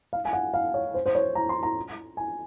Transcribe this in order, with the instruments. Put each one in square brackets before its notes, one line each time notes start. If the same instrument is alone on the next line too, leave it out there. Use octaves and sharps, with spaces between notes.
[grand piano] F5
G#5
F#5
F5
C#5
C5
C5
C#5
A#5
C6
A#5
G#5